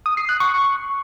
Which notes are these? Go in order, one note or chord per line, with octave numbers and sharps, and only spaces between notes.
D#6
C7
F#6
C#6